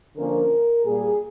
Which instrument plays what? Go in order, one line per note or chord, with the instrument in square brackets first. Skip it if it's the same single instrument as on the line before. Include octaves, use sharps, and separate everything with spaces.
[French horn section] D3 F3 A#3 C#4 A#4
A#2 G3 A#3 G#4